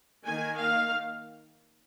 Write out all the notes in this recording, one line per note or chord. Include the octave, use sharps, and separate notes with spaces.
D#3 A#3 G#5
F5